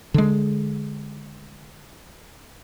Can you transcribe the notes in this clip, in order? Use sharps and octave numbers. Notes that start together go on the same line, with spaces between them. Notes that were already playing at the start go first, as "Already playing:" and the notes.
D3 G#3